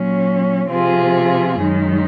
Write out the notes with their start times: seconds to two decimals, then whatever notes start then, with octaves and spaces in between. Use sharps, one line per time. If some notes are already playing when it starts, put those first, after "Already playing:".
Already playing: A#2 F#3 C#4
0.69 C3 F3 C4 F4 G#4
1.58 F#2 D#3 G#3 D#4